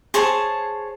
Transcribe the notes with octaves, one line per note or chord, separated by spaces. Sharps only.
G#4 C5 C#5 A5